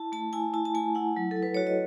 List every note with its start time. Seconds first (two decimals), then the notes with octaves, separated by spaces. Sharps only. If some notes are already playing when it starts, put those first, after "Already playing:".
Already playing: E4 A5
0.12 A3 A5
0.33 E4 G#5
0.53 E4 A5
0.65 A5
0.75 A3 G#5
0.95 E4 F#5
1.16 F#3
1.31 F#3 A4
1.43 B4
1.54 F#4 C#5
1.67 D#5